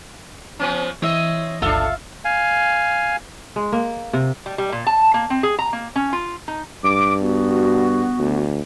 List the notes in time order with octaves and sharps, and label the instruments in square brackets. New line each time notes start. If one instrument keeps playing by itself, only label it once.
[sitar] F3 B3 C#4
[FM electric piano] E3 [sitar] C4 D#5 [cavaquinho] C#5 E5
[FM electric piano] G1 C#2 [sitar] D4 A4 [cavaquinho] F4 E5 F5
[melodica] F5 G#5
[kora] G#3
A#3
C3
[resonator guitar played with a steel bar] G3
G3
A#2
A5
A#3
C4
G#4
A#5
A#3
C#4
F4
D#4
[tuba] G2 [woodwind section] D6
[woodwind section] B3 F#4
[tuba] D2